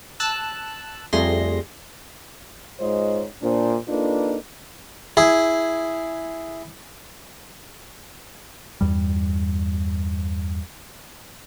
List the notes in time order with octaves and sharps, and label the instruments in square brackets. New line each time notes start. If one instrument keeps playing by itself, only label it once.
[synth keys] A5 E6 F#6
F2 G3 A3 G#4 C6 A#6
[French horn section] G#2 G#3 F4 C5 C#5 D#5
A#2 D4 C5
A#3 D4 D#4 F4 A4 B4
[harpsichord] E4 G#4
[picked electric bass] E2 G2 G3